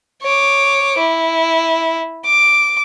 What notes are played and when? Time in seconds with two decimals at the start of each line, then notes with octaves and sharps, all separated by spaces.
0.22 C#5 D6
0.98 E4
2.25 D6